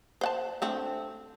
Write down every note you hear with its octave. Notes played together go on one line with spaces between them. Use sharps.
C5 F#5 A5
A3 C4 D4